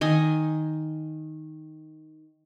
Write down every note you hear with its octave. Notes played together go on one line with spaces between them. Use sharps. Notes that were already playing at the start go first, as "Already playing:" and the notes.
D#3 D#5 G#5